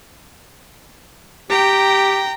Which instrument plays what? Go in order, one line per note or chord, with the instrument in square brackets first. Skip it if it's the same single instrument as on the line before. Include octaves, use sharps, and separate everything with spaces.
[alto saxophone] G4 [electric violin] G5 A#5